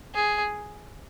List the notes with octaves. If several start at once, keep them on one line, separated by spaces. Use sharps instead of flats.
G#4